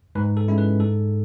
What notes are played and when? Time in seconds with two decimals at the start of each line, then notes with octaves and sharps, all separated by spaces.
0.15 G#2 B4
0.37 A4
0.48 G#3 C#4 E4
0.58 B4
0.79 G#2 A4